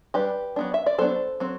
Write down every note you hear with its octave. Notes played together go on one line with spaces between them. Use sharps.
G3 D4 G4 B4
F#3 B3 D4
E5
D5
F#3 B3 D4 A4 C5
F#3 C4